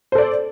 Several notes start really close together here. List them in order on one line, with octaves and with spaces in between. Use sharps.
C5 A4 D5